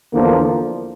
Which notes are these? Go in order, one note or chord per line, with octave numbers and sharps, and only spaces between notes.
E2 D3 F3 A#3